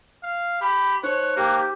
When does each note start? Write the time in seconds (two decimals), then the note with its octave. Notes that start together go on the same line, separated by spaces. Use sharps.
0.23 F5
0.61 G4 B5
1.03 D#4 C5 C#5 F#6
1.37 A#3 G4